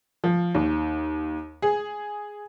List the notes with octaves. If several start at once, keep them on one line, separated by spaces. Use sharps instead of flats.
F3
D#2
G#4